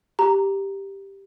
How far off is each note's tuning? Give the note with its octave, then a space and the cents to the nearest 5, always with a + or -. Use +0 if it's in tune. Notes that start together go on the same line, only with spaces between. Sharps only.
G4 +0 A#5 +0